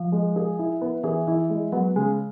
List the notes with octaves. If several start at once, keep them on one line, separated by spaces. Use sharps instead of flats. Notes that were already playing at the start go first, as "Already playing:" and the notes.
Already playing: F3
G#3
G#4
E4
B3
E3 G#4
E3 E4
G#3
F#3 B3
C#3 G#3